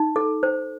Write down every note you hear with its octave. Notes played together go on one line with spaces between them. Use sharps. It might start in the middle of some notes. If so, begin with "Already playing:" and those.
Already playing: D#4
A4
C5